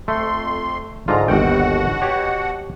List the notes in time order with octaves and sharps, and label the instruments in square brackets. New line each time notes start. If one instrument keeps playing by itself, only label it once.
[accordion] F2 C6 [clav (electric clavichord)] A3
[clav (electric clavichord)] G#2 D3 F4 [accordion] A#5
[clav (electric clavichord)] G1 D#2 G5 [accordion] B2 F#4 F#5
[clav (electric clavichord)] G4 C#5